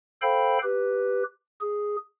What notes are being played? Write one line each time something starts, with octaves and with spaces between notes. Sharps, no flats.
A4 C5 F5 G5 B5
G4 B4
G#4